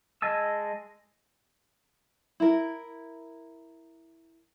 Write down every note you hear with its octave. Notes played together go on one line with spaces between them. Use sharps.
G#3 D#5 G#5 A5 E6
E4 A#4